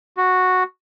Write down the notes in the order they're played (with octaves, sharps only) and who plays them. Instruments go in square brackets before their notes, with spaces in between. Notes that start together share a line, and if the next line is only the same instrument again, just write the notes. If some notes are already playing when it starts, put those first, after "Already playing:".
[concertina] F#4